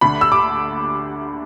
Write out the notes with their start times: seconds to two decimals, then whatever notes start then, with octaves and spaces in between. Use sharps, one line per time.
0.01 D2 D3 A3 D4 B5
0.21 E6
0.32 D6